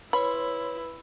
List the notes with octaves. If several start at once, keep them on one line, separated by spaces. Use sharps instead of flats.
E4 B4 C#5 B5 C6